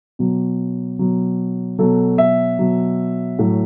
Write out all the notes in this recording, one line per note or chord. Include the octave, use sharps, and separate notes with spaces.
B2 F#3
B2 F#3
B2 F#3 A4
E5
B2 F#3
A2 F#3